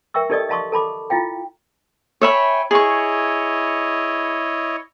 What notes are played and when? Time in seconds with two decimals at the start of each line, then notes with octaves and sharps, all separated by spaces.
0.14 A#4 E5 G5 C#6 E6
0.30 D#4 G4 A4 D5 D#5 D#6
0.49 D#5 F5 A5 C6 C#6 D#6
0.72 A4 A5 B5 D6
1.10 E4 F4 F5 G5
2.22 C#5 E5 G5 G#5 B5
2.71 E4 G#4 C#5 D#5 C#6